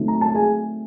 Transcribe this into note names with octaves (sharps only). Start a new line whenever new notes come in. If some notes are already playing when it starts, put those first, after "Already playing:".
Already playing: D3 F#3 A3 C4 D#4
A#5
A5
G#4 G#5